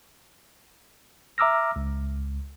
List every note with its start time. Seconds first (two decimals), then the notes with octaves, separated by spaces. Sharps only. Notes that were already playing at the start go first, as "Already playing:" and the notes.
1.38 E5 A#5 D6 E6 F6 A#6
1.76 C#2